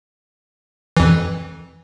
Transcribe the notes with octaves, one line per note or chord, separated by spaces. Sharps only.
F2 E3